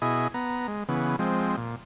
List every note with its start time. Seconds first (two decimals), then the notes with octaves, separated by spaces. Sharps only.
0.02 B2 E4 G#4 D#5
0.34 B3 A#5
0.68 G#3
0.89 C#3 E3 B3
1.19 F3 G#3 C4
1.57 A#2